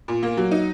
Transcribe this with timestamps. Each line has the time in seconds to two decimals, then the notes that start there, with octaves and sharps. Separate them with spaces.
0.08 A#2
0.23 A#3
0.37 F#3
0.51 D#4